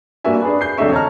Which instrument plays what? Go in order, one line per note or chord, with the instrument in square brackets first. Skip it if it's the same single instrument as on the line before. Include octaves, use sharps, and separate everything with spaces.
[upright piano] G2 A#3 F#4 D5 E5 G#5
D4 G#4 B4
G6 C7
E1 F2 D3 D#5 E5 C#6
C#5 A5 A#5 F6